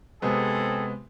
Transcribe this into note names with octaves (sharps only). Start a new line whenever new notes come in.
C3 G#3 B3 C4 G#4 A4